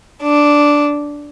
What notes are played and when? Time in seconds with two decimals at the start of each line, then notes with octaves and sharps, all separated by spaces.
0.23 D4